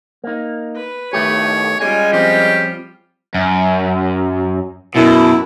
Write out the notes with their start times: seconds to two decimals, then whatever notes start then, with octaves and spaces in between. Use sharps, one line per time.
0.24 A#3 D#4
0.76 B4
1.13 B1 A2 D#3 A3 G4 C#5
1.80 G3 G#3 C#4 F4 G#5
2.13 F3 C4 G4
3.35 F#2
4.96 F#2 B2 E4